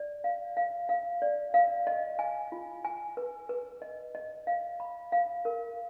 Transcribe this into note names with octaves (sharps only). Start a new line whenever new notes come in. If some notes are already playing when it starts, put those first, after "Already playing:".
Already playing: D5
F5
F5
F5
D5
F5
D#5
G#5
F4
G#5
B4
B4
D#5
D#5
F5
B5
F5
A#4